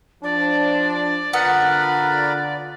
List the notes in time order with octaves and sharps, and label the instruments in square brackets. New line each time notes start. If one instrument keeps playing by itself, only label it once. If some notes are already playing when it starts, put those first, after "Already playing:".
[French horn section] F3 D4 [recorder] D5
[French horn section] D3 F4 [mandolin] B3 F#5 [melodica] A#4 B4 B5